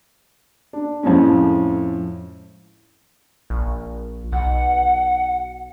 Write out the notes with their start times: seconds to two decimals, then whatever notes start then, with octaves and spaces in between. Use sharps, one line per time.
0.73 D4
1.03 F2 A2 G#3 C#4
3.50 A#1
4.32 B1 F#5